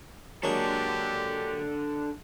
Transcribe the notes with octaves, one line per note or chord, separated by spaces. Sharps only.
F#3 G#3 A#3 D4 G4 A4